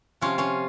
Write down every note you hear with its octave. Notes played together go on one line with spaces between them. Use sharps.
C3 F3 C#4 F4
C#4 F4